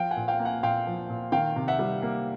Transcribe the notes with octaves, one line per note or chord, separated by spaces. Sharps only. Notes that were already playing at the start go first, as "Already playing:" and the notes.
Already playing: F3 F5 G5
F#5 G#5
A#2
F5 G5
A#3
F#5 G#5
A#2 F5 G5
F3
A#2
D#3 F5 G5
C3
E5 F#5
G3
A#3